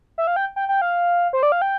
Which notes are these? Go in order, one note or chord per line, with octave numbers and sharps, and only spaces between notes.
E5
F5
G5
G5
G5
F5
C5
D5
F5
G5